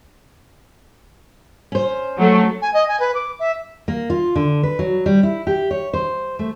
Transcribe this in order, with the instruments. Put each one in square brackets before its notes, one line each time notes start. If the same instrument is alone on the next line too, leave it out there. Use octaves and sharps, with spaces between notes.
[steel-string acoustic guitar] C#4 C5
[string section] F#3 A3
[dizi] G#5
D#5
G#5
B4
D6
E5
[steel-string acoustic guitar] A#3
F4
D3
B4
F#3
G3
E4
G4
C#5
C5
A3